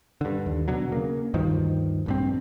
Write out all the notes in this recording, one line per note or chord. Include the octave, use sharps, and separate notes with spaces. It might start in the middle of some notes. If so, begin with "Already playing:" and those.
G2 D3
D#2
B2 D3 F#3
C#3 A#3
D2 G2 D#3 F3
A#1 G2 C4